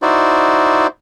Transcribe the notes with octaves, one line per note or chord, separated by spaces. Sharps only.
D#4 E4 F#4 C5 D5